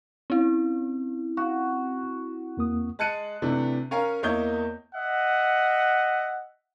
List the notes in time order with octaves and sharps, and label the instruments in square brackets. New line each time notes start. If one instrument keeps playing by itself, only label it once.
[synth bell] C4 E4 [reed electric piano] C#4
[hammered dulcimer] F#4
[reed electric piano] E2 A#3 D#6
[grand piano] G#3 A5 F#6 C#7 D#7
C3 E3 A3 D4
C#4 A#4 C#5 F5 G#5 A#5
E2 A#3 C#5 D#5 E5 G6
[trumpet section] D#5 E5 F#5